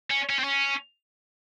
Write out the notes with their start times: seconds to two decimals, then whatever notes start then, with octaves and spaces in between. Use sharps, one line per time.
0.11 C#4
0.30 C#4
0.39 C4
0.44 C#4